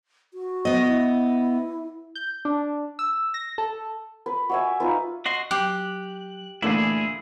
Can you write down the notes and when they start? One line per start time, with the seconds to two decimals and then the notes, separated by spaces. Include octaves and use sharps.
0.34 F#4
0.65 B3 D#5
0.87 E4
2.15 G6
2.45 D4
2.99 E6
3.34 A#6
3.58 A4
4.26 B4
4.49 F#4 E5 G#5
4.80 D#4 F4 B4
5.26 F#4 D#5 C6
5.51 F#3 G4 F#6
6.62 A#2 D3 E3 A3 E4 G#4